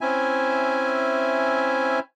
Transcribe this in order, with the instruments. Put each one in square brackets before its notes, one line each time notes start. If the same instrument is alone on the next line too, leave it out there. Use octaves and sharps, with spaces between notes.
[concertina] C4 C#4 E4 E5 G#5